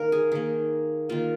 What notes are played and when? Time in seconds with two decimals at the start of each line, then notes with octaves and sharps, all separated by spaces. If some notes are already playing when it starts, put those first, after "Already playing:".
Already playing: D#3 A#3 A#4
0.12 G#4
0.32 D#3 A#3 G#4
1.09 D#3 A#3 F4